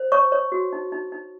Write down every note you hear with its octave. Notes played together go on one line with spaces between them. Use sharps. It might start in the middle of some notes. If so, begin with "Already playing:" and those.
Already playing: C5
C#5 C#6
C#5
F#4
D#4
D#4
D#4